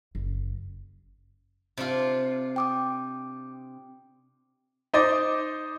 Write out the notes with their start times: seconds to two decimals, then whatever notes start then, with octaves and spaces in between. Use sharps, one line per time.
0.15 F#1
1.77 C3 D4 F4
2.56 G5 D6 D#6
4.94 D#4 C5 D#5 D6 A6